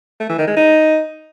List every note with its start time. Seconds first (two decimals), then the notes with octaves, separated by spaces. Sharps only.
0.20 A3
0.29 E3
0.38 D#3
0.47 G#3
0.56 D#4